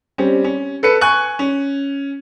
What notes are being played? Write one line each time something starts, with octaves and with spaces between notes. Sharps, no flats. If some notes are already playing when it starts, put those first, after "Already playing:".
G3 C4 C#4
C#4
A4 B4 C#7
G#5 C#6 F#6
C#4